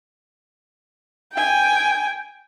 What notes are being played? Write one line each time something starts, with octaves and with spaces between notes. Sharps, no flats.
G5 G#5